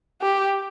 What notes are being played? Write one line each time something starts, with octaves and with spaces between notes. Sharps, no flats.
G4